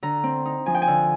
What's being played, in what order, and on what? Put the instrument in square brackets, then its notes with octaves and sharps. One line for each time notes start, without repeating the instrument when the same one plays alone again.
[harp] D3 A#5
C4
D#4
F3 G#5
G5
G#5
D3